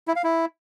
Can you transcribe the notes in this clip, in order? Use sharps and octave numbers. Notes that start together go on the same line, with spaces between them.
E4
F5
E4